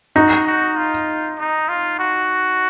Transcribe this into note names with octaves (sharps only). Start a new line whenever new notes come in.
D#4 F#4
F#4
F4
D#4
F4
F#4